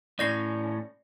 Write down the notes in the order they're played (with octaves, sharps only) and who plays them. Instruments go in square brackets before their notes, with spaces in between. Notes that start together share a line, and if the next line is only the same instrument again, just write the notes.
[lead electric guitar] A2 C#4 [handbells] D5 A#6 C7